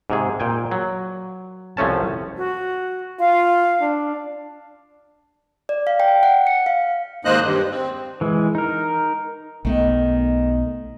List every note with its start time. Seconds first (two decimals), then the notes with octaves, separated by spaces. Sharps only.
0.10 G#2 C3 G#4
0.40 A#2 G5 G#5
0.71 F#3
1.77 C2 F3 A3 C#4 A5
2.37 F#4
3.20 F4 F5
3.81 D4
5.69 D5
5.87 F5
6.00 G5
6.23 F#5
6.47 C#7
6.66 F5
7.25 D#2 G#2 A#3 C5 D#5 F#6
7.43 G2
7.71 C4
8.21 E3 G#3
8.55 D#4 A#4
9.65 B1 D#3 A3 B3